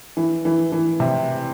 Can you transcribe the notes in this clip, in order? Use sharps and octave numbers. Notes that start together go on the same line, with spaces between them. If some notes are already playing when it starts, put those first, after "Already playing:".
E3
E3
E3
C3